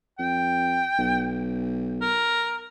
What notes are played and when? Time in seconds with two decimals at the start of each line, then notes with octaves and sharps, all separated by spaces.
0.19 F2 G5
0.98 B1
2.01 A#4